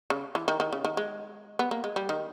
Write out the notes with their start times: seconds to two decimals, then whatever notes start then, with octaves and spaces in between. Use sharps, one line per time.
0.10 C#3
0.35 E3
0.48 D#3
0.60 D#3
0.73 C#3
0.85 D#3
0.97 G#3
1.59 B3
1.71 A#3
1.84 G#3
1.96 G3
2.09 D#3